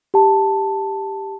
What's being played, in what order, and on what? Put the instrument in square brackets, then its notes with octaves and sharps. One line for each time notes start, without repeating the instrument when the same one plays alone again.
[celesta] G4 A5